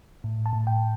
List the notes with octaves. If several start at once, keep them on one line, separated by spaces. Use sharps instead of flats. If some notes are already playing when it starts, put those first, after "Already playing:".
A2
A5
A2
G5